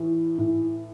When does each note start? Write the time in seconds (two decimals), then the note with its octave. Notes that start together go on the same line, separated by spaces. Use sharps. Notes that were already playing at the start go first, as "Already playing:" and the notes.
Already playing: A2 E3
0.38 A2